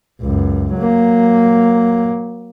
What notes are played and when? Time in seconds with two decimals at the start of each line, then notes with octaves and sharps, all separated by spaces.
0.21 C#2 F#2
0.75 F#3 A#3